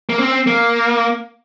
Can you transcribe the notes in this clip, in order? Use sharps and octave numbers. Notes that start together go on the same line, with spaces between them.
A#3
C4
A#3